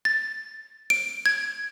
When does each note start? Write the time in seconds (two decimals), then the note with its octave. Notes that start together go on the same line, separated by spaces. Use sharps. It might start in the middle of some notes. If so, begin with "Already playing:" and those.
0.05 A6
0.90 D7
1.26 G#6